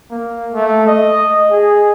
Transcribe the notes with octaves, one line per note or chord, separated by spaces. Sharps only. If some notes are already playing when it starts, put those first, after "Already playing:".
A#3
A3
D#5
G#4